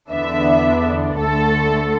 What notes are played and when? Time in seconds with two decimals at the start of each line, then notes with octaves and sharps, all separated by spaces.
0.12 E2 D3 B3 D4 E5
1.17 D2 D3 A3 A4